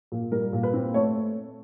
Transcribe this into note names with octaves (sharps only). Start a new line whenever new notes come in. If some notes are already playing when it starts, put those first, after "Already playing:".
A#2
G3 A#4
A#2
B4
C4
A3 C#5